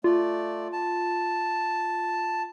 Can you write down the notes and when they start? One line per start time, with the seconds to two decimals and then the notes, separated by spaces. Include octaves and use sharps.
0.04 A3 F4 D5
0.72 A5